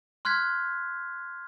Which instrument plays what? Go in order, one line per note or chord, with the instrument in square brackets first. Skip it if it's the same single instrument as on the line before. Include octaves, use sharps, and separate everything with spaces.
[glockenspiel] C6 F6 F#6 G#6 B6